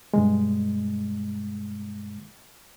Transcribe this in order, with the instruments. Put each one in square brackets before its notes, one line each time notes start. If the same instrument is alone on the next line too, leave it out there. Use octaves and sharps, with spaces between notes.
[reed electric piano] G2 B2 G#3